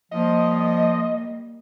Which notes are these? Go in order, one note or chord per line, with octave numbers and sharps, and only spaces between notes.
F3 G3 A#3 D#5